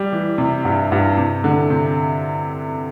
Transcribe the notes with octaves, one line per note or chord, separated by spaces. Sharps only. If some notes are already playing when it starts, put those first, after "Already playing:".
Already playing: G3
E3
C3
G2
G2
C3
D3
C3